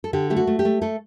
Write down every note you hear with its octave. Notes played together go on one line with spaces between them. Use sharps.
A4
D3 G4
A3 G4
F#4
A3
G4
A3
A3 A4